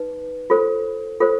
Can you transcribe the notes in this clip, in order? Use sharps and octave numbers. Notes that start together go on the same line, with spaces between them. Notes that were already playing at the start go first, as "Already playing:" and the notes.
Already playing: D#4 B4
F4 A4 C5
F4 A4 C5